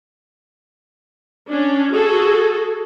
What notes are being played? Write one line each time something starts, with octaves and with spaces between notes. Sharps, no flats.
C#4 D4
F#4 G#4 A4